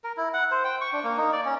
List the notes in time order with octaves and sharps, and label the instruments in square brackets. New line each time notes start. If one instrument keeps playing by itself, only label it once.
[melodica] A#4
E4
F#5
C5
G5
C#6
D4
A#3
D#4
D5
C#4